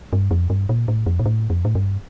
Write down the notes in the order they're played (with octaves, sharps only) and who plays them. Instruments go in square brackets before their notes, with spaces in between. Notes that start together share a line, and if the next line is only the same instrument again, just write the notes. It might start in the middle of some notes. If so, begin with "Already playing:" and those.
[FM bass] G2
F2
G2
A#2
A2
F2
A#2
A2
F2
A2
G2